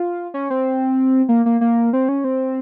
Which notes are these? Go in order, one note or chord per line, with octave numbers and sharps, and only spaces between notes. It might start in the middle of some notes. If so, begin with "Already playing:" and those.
Already playing: F4
C#4
C4
A#3
A#3
A#3
C4
C#4
C4